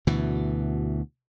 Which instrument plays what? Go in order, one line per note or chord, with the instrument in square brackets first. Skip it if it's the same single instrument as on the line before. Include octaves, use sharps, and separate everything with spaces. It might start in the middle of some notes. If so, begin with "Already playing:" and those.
[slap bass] D2 B2 E3